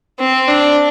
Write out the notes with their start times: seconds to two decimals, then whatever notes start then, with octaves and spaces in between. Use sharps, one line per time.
0.19 C4
0.48 D4